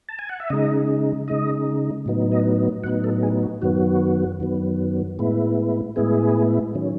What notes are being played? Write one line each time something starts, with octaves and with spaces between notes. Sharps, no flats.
A5
G#5
F#5
E5
C#3 G#3 D#4 D#5
C#3 G#3 D#4 D#5
A2 F#3 B3 D#4
D#5
A2 F#3 B3 D#4 F#5
A4
G#4
F#4
F#2 D#3 F#3 B3 F#4
F#2 D#3 F#3 B3
A2 G#3 B3 E4
A2 G#3 B3 E4 G#4
D#3 F#3 C#4